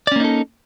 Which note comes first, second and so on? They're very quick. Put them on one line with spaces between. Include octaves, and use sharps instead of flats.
D5 C#4 A#3 D#4 A4